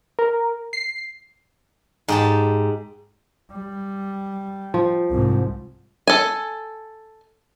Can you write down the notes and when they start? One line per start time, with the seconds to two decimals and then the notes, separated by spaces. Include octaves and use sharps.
0.19 A#4
0.73 C7
2.08 G#2 G4 A5
3.52 G3
4.74 F3
5.10 C2 G#2
6.07 A4 G#5